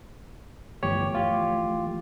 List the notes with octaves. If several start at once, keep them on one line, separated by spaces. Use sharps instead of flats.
G1 E3 F3 A3 G4 C#5
F4 G4